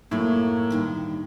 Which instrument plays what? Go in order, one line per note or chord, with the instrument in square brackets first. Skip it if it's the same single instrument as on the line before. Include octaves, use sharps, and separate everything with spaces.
[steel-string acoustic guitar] F#2 F#3 [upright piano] A2 [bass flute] A#3
[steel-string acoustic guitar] G2 D3 D#3